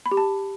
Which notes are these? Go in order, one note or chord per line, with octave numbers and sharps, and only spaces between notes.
B5
G4
A5